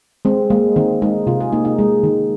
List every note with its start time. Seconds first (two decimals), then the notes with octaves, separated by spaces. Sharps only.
0.25 G#3 C4
0.50 G#3 A#3
0.76 D#3 C4
1.02 G#3 D#4
1.27 C3 F4
1.40 G#4
1.52 A#3 D#4
1.65 D#4
1.79 G#3
2.04 D#3